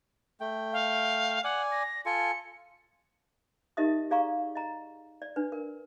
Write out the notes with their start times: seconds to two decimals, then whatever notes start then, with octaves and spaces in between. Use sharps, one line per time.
0.40 A3 G5
0.73 F5
1.44 D5 F#5 G#5
1.72 A#6
2.06 F4 A4 G#5 C#7
3.77 D#4 G4 A#4 D#5 E5 D#6
4.11 G#4 D5 F5 A#5 C#6
4.55 D#5 A#5
5.22 D5
5.36 D4 B4
5.52 A#4